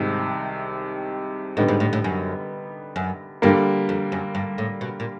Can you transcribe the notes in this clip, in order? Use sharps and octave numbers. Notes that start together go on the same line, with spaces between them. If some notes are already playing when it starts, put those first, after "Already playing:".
Already playing: C2 G#2 C3 D#3 G#3 C4
A2 D3 G3 B3 D#4
G#2
A2
A2
F#2
F#2
G2 D3 G3 A#3
F2
F#2
G2
A2
B2
A#2